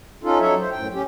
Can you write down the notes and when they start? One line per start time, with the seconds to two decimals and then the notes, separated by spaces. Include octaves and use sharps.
0.24 C#4 D#4 F4 A4
0.40 F#3 D#4 A4 C#5 E5
0.59 C5
0.71 F#2 A2 G5
0.94 C#4 G4